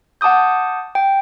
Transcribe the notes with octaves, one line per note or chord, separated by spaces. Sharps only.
F#5 A5 D6 D#6 G6
G5